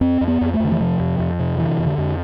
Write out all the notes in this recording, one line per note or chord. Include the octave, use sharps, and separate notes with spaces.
F2 C4
F2
B3
F2
A3
F2 D3
E3
C3 F3
F2
F2
C3
D3 E3
F2
D3
F2